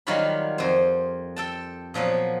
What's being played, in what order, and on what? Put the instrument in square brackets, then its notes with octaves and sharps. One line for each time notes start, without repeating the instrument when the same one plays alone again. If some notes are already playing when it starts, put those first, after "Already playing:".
[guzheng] D#3 F#3 G3 F4 C#5 B5
F2 C5
A4 G5 A5
A#2 F3 F#3 B3